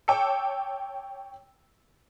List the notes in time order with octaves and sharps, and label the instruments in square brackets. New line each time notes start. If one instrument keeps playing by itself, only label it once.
[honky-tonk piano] C#5 G5 A5 D6 E6 C#7